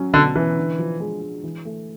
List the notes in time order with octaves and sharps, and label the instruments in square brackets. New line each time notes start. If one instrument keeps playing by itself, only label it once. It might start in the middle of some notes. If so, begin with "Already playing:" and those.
Already playing: [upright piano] F#3 C#4
[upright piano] B2 [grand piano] D3
[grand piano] E3 [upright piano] C#4
[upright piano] D3
F3
G#3
G#3
E3
A3